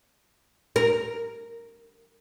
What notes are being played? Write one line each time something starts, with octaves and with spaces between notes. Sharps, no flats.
A#4